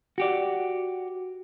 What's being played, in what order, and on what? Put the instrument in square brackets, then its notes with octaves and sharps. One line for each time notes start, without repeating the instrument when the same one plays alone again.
[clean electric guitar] F#4 G4 D5